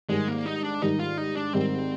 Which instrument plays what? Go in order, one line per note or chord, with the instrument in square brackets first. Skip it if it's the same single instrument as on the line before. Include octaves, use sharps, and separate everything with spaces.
[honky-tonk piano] G#2 D#3 G3 [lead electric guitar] G#3
[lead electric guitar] A#3
D#4
D4
[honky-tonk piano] G#2 D#3 G3 [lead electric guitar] D#4
[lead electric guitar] F4
D#4
D4
[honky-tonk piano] G#2 D#3 G3 [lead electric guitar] C4